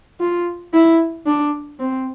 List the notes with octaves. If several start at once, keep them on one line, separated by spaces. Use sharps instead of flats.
F4
E4
D4
C4